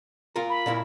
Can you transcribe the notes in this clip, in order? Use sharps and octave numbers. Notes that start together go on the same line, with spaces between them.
F4 A#4
B5
A#2 A#3 E4